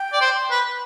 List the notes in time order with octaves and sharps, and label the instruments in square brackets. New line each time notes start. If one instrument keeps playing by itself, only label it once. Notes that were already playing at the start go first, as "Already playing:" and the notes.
Already playing: [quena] G5
[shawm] D5
C5
B4